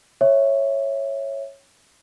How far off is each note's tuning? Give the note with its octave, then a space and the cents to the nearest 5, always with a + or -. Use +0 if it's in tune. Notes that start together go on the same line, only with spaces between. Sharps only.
C#5 -10 E5 +0